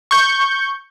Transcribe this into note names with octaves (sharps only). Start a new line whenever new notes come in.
C#6 G6